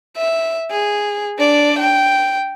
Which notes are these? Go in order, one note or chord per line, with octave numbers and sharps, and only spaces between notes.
E5
G#4
D4 D5
G5